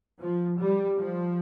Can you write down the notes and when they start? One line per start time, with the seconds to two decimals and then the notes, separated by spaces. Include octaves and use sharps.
0.20 F3
0.59 G3
0.99 F3